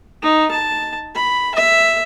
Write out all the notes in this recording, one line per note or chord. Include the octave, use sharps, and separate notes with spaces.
D#4
A5
B5
E5